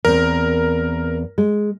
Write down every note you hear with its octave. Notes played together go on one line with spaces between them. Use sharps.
E2 C4 A#4
G#3